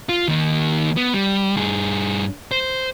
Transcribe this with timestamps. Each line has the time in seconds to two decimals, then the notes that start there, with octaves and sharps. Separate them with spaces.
0.09 F4
0.28 D#3 A#3
0.97 B3
1.14 G3
1.56 G2 G#4
2.52 C5